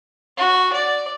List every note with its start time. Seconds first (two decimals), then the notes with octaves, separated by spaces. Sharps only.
0.38 F#4
0.73 D5